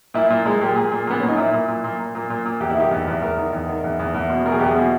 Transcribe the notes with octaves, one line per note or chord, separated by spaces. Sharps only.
A#2 E4
A#2
A#2 G#3
A#2 G4
A#2 G#4
A#2
A#2 B3
A#2 C#4
D#4
A#2 E4
A#2
A#2
A#2
A#2
A#2
A#2
A#2
E2 G4
E4
D#3 G4
E2
E2
E2 A#4
D#3
E2
D#3
E2
E2
E2
B2
B2 A#4
G#4
E2 G4
G#4
B2